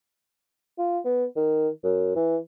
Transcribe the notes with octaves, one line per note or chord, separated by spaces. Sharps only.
F4
B3
D#3
F#2
E3